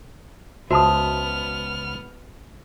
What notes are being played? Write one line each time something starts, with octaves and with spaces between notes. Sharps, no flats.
C#2 B3 F#4 C5 E5 A5 D#6 F6